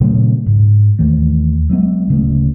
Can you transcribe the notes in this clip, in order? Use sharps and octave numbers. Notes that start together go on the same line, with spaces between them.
A#2 C#3 F#3 A3
G#2
D#2 E3 A3
F#3 G#3 B3
D1 C#3 A3